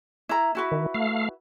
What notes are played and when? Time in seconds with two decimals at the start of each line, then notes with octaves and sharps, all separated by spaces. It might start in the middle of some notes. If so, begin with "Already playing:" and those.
0.29 E4 A#5
0.55 E4 F#4 B4
0.72 D#3
0.94 A3 F5